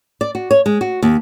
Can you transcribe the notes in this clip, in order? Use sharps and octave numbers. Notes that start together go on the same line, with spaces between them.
D5
F#4
C#5
G#3
F#4
D#2